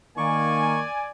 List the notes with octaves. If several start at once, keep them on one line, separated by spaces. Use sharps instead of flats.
D#3 A#3 D5 G#5 C#6